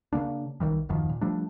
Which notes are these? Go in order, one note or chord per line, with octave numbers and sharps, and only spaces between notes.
C#3 E3 A#3 D4
B1 D#3 E3 G3
D#1 F#2 D#3 F3
A#2
F3 G3 A3 D4